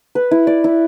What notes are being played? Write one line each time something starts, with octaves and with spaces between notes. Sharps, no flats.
B4
E4
D5
E4